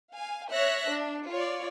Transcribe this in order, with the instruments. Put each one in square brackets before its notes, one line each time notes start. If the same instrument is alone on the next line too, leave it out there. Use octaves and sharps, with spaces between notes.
[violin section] F5 G#5
C#5 E5 F#6 A#6
D4
F4 C#5 D5